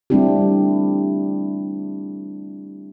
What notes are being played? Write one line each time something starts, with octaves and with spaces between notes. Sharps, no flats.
G3 A3 C4 D4 E4 G4